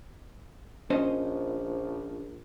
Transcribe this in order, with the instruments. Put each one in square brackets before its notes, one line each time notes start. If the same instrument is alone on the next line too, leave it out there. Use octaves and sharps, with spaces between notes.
[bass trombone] A#1 [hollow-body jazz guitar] C#4 C5 D#5